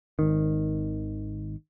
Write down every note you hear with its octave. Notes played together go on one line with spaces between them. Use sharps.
G#1 D#3